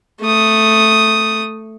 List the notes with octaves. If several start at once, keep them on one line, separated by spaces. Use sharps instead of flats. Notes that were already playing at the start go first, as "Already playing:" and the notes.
A3 D#6